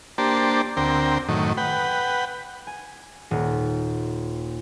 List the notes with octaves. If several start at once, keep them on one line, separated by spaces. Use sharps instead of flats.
A#3 D4 G4 C5 A5
D2 C4 A#4 G5
F#2 A2 D#3
B4 F#5 G5
G#5
D#1